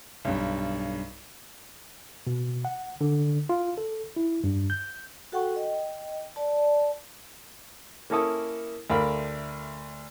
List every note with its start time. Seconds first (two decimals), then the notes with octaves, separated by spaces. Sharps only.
0.25 B1 G2
2.27 B2
2.65 F#5
3.01 D3
3.49 F4
3.78 A4
4.16 E4
4.44 G2
4.70 G6
5.32 F#4 A4 F#5 G5 C#6
5.56 D#5 G5
6.36 D5 A5
8.10 A#3 C#4 E4 A4 C#6 D#6
8.90 D2 A3 A#4 D5 F5 B5